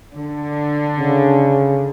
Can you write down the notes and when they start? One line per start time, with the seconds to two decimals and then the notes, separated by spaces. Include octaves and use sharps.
0.12 D3
0.99 C#3